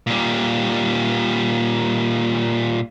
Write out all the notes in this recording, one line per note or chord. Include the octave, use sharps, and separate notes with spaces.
A#2 G3